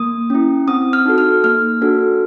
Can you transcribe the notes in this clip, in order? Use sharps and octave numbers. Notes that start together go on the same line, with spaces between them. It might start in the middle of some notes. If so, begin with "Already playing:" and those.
Already playing: A#3 D#6
C#4 E4
C4 D#6
F6
D#4 F#4 A4
F6
A#3 F6
D4 F#4 A4